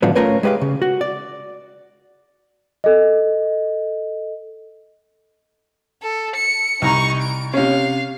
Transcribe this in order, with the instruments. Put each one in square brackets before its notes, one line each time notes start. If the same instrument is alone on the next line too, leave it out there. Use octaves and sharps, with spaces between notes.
[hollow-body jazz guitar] A2 D3 D#3 F3 F#3 B3
A3 C#4 F4 A#4 B4 C#5
G#3 G4 B4 D5 F5
C#3
F#4
D5
[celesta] A4 D#5
[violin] A4
C#7
[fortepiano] C2 A#5 [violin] D#4 C#6
[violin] D7
[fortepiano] C3 C#4 [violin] F5